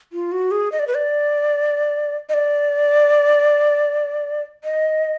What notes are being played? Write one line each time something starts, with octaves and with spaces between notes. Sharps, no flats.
F4
F#4
G#4
D#5
D5
B4
D5
D#5
D5
D#5